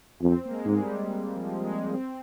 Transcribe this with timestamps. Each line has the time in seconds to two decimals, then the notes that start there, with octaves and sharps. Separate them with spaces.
0.21 F2 C4
0.45 A#3
0.51 G#3
0.65 G#2
0.72 G#3
0.79 G3
1.36 F3
1.64 G#3
1.94 C4